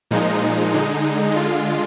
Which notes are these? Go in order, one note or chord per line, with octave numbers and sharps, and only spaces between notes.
A#2 F3 G#3 D#4
D3 G#3 D#4
D3 G#3 F4